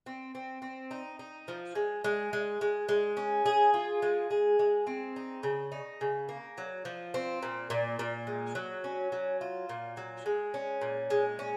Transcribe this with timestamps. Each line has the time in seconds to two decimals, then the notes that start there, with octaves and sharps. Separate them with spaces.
0.06 C4
0.35 C4
0.62 C4
0.91 D#4
1.19 D#4
1.48 F3
1.75 G#3
2.04 G#3
2.33 G#3
2.61 G#3
2.89 G#3
3.17 C#4
3.46 G#4
3.74 F4
4.02 G#3
4.30 G#4
4.59 G#3
4.87 C4
5.16 D#4
5.43 C#3
5.72 D#4
6.01 C#3
6.29 A#3
6.58 F#3
6.85 F3
7.14 C4
7.43 A#2
7.70 A#2
7.99 A#2
8.27 G#3
8.55 F#3
8.84 C#4
9.12 F#3
9.41 F4
9.69 A#2
9.97 F#3
10.26 G#3
10.54 C#4
10.81 A#2
11.10 G#3
11.39 C#4